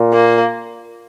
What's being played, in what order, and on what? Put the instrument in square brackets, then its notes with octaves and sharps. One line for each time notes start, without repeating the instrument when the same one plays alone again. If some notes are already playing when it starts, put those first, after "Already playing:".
Already playing: [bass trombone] A#2
[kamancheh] A#3